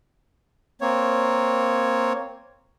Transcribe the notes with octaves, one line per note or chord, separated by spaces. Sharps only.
A#3 C4 C#5